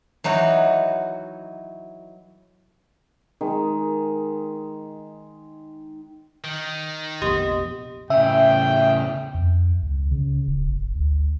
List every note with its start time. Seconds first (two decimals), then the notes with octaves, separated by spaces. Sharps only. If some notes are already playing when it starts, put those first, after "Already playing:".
0.24 E3 F#3 D#4 F#4
3.41 D#3 G#3
6.44 D#3
7.22 F1 A#1 B3 G4 D#5
8.10 A2 C#3 E5 G5
9.34 F2
9.83 C#2
10.11 C#3
10.48 D#1
10.67 G1
10.95 D2